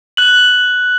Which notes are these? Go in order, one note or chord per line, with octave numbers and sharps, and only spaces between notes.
F#6 F#7